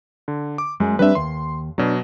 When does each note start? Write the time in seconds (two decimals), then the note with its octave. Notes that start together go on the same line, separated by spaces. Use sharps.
0.28 D3
0.58 D6
0.80 F#2 G#3
0.99 G3 C4 D4 B4 E5
1.15 D#2 C6
1.78 B2 F#3 D4